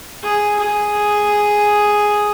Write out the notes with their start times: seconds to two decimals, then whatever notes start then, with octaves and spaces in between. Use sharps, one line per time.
0.23 G#4
0.59 G#4